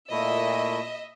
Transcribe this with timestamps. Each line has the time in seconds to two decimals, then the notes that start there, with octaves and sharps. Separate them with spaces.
0.11 A#2 A3 E4 D#5 E5